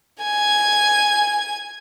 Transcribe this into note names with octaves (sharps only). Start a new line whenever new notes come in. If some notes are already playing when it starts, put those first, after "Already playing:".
G#5 G#6